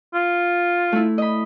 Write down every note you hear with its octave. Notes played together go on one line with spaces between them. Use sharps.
F4
A3 E4
D#5 B5